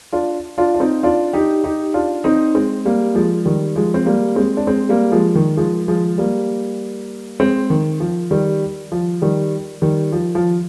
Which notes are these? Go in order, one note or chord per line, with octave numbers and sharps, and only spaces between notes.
D4 F4
D4 F4
D4
C4 D#4
D4 F4
D#4 G4
D#4 G4
D4 F4
C4 D#4
G#3 C4
G3 A#3
F3 G#3
D#3 G3
F3 G#3
C4
G3 A#3
G#3 C4
D4
G#3 C4
G3 A#3
F3 G#3
D#3
F3 G#3
F3 G#3
G3 A#3
G#3 C4
D#3
F3
D#3 G3
F3
D#3 G3
D#3 G3
F3
F3